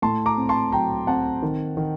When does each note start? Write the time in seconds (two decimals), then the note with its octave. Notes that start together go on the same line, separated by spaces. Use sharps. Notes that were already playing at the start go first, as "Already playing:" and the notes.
0.02 A2 A5 C6
0.26 A#5 D6
0.37 C4
0.49 A5 C6
0.72 F#3 G5 A#5
1.07 C4 F#5 A5
1.42 D#3
1.77 D#3